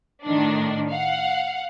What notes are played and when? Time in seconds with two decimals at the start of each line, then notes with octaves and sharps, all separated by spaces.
0.24 A2 D#3 D4
0.90 F5 F#5